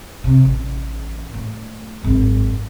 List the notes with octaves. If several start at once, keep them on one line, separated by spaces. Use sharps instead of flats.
C3
A1
A2
G#1 F#2